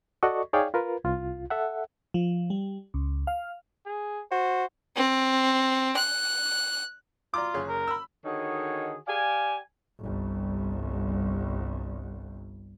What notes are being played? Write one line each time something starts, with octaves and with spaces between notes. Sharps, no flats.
F#4 A4 D5 D#5 C#6
D#4 G#4 C#5 D5 F5 G5
F4 A#4 B4
C2 F4
A4 E5 F#5
F3
G3
C#2
F5
G#4
F#4 C5
C4
F#6
F4 D5 A#5 D6
F#1 G#4 C#5
A#4
B5 E6
D3 D#3 D#4 F#4 G#4 C#5
G4 D5 F5 G#5
G1 C2